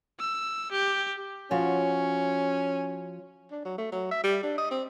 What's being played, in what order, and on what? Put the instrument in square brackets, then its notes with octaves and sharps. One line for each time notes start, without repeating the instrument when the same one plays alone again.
[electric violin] E6
G4
[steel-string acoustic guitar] F3 F#4 C#5 [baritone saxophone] C#4
[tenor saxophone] D4
F#3
A3
F#3
E5
G3
D4
D#5
C4